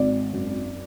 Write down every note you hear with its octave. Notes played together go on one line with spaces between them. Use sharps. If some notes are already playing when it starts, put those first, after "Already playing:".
Already playing: G#1 D5
F#2